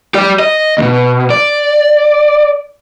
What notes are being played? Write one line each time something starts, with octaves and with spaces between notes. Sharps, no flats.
G4 D5
D#5
D2 B2
D5